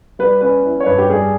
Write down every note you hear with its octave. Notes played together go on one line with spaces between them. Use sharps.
G3 B4
C#4 B4
E4
C#5
G2 B4
G4
G3 G#4